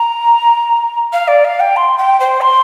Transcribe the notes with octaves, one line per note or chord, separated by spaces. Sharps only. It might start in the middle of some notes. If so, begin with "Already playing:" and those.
Already playing: A#5
F5
D5
F5
G5
C6
G5
C5
C6